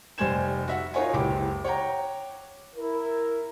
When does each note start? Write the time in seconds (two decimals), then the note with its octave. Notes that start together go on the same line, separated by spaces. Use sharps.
0.18 F1 G3 C5 G#5 G#6 E7
0.68 F#4 E5 F#5
0.94 D#4 F4 A#4 C#5 F#5 G#5
1.13 F#1 C#2 E4 G4 G5 D6
1.64 C#5 F#5 G5 A#5
2.76 E4 A#4